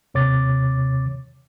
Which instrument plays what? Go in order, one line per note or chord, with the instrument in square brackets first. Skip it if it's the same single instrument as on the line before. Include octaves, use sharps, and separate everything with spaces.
[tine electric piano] D#2 C3 C#5 D6 A6